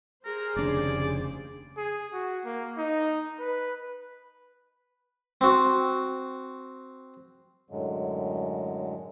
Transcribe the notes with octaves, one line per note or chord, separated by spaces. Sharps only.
G4 G#4 A#4 C5
F1 D#2 C#3 D4 D5
G#4
F#4
A#3
D#4
B4
C4 F#4
F#2 A2 D3 F#3 G#3